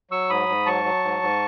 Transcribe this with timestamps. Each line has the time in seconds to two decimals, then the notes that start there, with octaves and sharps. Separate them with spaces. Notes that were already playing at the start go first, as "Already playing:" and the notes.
0.10 F#3 C#6 E6
0.30 G#2 B5 D#6
0.49 G#2
0.66 F#3 A5 C#6
0.85 F#3
1.04 G#2
1.23 G#2